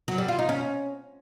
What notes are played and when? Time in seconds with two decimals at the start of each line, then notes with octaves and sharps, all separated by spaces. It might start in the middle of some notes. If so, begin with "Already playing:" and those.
0.08 F#3
0.18 G3
0.28 F4
0.39 D#4
0.49 C#4